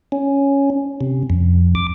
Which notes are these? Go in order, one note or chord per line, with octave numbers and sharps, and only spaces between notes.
C#4
C3
F2
D6